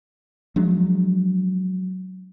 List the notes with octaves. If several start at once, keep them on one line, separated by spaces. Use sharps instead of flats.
F3 F#3 G#3 D4